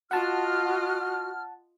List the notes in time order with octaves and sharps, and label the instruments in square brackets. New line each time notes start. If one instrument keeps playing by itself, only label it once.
[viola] F4 D#5 [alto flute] F#4 [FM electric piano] F#5 A5 [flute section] F6